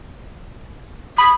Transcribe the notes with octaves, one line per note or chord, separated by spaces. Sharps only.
B5 D#6